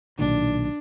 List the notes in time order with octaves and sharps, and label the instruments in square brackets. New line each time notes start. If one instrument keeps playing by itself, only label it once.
[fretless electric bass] B1 A#2 D#3 [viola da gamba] D4